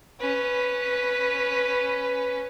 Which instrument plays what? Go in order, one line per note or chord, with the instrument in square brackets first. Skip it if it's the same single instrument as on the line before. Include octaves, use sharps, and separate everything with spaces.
[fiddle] C#4 B4